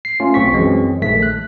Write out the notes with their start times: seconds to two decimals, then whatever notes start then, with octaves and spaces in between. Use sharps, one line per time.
0.05 C7
0.20 A3 C#4 F4
0.34 B1 C4 C#6 B6
0.52 F#2 E3 F#3 G#3 C4
1.02 A#1 D#3 G#3 A3 B6
1.23 F#6